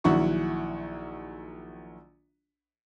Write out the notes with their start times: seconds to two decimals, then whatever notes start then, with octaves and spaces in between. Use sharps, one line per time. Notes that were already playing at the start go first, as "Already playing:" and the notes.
0.04 A#1 D#3 F#3 E4 F#5 C#6